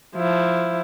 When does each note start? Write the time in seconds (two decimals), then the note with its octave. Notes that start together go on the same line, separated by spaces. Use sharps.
0.16 F3 E4